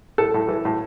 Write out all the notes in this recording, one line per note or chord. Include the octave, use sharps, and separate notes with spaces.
A2 A4
A2
E3
A2